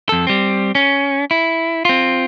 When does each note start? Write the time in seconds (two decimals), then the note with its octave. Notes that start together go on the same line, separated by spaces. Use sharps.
0.09 F2 A4
0.27 G3 C4
0.75 C#4
1.31 E4
1.85 C4 F4